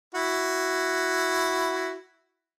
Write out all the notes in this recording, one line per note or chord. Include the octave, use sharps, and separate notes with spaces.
E4 F#4